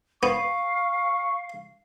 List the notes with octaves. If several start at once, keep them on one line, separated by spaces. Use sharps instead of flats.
B3 F5 C#6